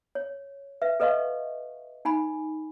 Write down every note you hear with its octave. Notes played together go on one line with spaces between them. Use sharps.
C#5
B4 E5
A4 B4 D#5 F5 C#6
D#4 G#5 B5